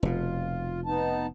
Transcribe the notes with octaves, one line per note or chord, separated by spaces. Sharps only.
F1 B2 F4
B3 D#4 A5